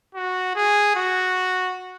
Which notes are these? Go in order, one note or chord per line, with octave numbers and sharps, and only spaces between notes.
F#4
G#4
F#4